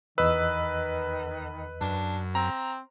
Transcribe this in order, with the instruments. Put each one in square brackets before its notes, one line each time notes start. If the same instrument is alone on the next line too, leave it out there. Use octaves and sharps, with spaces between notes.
[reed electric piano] E2 D#5 E6 [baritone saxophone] D#3 [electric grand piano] B4
[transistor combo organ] F#2 [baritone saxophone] D4
[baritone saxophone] C4 [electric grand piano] A#5